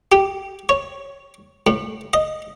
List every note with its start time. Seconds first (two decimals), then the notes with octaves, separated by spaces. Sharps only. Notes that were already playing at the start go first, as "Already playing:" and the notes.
0.12 G4
0.69 C#5
1.67 A2
2.13 D#5